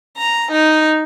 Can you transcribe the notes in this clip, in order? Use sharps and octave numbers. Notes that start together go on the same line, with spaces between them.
A#5
D#4